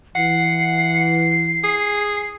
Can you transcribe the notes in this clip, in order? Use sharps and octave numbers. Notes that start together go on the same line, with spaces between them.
E3 F#5 C7
G#4